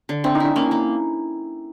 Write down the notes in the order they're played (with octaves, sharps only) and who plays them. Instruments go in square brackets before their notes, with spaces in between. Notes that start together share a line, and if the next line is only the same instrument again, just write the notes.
[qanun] D3
[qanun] C4 [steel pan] D4
[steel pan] D#4
[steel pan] D4 [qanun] E4
[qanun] A#3 [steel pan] C#4
[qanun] A#3